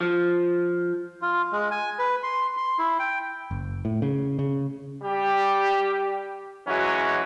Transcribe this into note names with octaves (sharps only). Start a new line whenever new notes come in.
F3
F4
G#3
G#5
B4
C6
C6
E4
G5
F#1
A2
C#3
C#3
G3 G4
E3 F#3 G#3 C#4 F#4